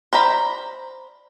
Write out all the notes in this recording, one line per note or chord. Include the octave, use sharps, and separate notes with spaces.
C5 D5 A#5 B5